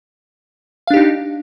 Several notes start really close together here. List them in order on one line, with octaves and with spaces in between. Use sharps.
F5 D4 G4 D#4